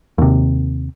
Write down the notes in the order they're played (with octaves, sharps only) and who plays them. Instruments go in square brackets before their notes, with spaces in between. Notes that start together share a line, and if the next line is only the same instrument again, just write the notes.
[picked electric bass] D#2 C3